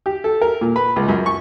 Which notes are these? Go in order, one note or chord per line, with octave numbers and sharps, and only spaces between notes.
G4
A4
A#4
A#2
B4
C#2
F#2
C#6